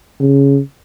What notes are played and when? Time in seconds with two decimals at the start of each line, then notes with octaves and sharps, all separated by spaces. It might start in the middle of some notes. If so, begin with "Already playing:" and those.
0.21 C#3